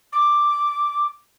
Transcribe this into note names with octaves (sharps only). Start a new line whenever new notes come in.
D6